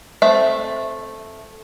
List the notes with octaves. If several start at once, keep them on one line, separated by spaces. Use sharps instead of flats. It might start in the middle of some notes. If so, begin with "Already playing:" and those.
A3 C4 E5